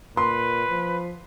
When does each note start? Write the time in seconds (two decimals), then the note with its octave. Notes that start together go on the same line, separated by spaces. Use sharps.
0.17 A#2 B4 C6
0.70 F3